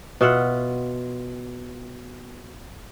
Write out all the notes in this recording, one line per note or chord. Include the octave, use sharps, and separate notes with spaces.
B2 F4 E5 F#5